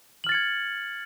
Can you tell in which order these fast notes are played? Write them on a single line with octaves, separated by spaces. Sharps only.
F#7 F6 A6 C#7 G#6